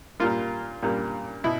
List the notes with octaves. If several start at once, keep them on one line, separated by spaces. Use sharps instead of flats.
A#2 G3 A#3 F4
A#2 G3 A#3
B2 E4